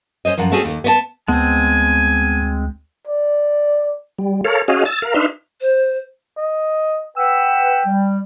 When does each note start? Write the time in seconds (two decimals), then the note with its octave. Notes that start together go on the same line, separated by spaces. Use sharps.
0.25 C#4 C5 C#5 D#5
0.38 F#2 F3 A#4 F#5
0.52 A3 C4 C#4 F#4 G#4
0.65 D#2
0.84 B3 C#5 A5
1.28 D2 G#3 B3 C4 F#5 G#5 A5
3.07 D5
4.19 G3
4.45 A4 A#4 C#5 F5
4.68 C#4 F#4 G#4 D#5 F5
4.85 E6 A6
5.02 A#4 F5
5.14 D4 D#4 B4 E5 C6 F6
5.60 C5
6.37 D#5
7.17 B4 F#5 G5 E6
7.86 G3